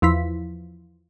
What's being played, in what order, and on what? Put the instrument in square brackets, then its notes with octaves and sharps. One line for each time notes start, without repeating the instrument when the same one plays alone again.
[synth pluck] E2 F3 E4 B6